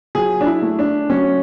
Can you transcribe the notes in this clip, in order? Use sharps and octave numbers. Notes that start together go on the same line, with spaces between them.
F#3 G#4
D4
E4
A3
D4
F#3 C#4